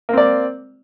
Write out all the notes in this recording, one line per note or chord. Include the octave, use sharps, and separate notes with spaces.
A#3 C4 D5